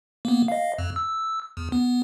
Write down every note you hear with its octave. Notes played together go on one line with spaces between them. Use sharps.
A#3 B3
D#5 F5
F2
E6
E2
B3